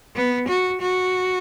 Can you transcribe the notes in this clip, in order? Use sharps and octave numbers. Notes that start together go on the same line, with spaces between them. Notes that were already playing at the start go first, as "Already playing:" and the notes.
B3
F#4
F#4